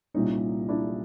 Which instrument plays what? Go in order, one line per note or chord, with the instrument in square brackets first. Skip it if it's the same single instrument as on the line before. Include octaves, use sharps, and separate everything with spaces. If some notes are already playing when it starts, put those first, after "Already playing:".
[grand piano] C2 A#2 G3 [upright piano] C#4 D#4
[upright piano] D4 E4